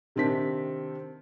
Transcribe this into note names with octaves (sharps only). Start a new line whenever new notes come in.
C3 D#3 C4 D4 B6